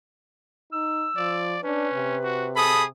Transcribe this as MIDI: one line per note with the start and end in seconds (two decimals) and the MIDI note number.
0.73 1.08 63
0.73 1.41 88
1.16 1.58 53
1.16 1.63 74
1.64 2.16 61
1.64 1.88 62
1.64 2.71 71
1.94 2.90 48
2.24 2.47 66
2.56 2.86 68
2.56 2.83 69
2.56 2.83 83
2.56 2.83 87